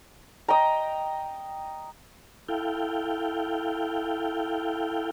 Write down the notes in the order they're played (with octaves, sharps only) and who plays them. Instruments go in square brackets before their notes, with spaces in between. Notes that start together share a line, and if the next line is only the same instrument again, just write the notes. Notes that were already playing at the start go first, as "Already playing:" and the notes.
[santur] D#5 G5 A#5
[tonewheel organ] E4 A4 F5 G5